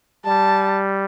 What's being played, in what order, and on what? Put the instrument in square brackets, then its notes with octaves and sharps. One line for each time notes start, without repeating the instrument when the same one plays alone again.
[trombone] G3 [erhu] A5